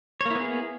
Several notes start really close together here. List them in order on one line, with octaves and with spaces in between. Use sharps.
C#5 A#3 E4 B3 G#4